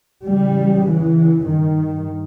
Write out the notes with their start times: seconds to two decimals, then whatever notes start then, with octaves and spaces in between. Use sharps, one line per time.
0.24 E2 C#3 G3
0.85 E3
1.45 G2 D#3